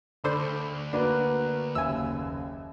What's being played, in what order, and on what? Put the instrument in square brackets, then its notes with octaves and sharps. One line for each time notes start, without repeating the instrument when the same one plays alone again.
[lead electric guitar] D2 [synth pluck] D4 A4 C5 [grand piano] B5
[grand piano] A#3 F#4 B4 [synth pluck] D4
[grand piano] F#1 D#2 E5 [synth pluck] G#5 E6